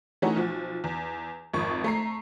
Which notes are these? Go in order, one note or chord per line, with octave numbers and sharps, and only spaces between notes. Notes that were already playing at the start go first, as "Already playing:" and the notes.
E3 A3 C#4 D#4 F#4
B1 F3
E2
G#1 F2 C#6
A3 A#5 C7